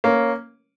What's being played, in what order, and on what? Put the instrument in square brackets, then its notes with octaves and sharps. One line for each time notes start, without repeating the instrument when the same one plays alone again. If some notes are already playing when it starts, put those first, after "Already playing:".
[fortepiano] A#3 C#4